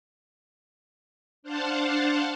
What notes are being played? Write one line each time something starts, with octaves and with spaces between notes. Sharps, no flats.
D4 C5 F5 F#5 A5